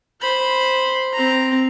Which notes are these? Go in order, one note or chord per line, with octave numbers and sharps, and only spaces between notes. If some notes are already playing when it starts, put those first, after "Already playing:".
C5 B5
C4 A#5